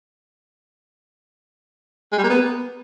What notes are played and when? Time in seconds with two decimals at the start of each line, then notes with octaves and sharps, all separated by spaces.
2.13 G#3
2.18 G3
2.24 A#3
2.29 B3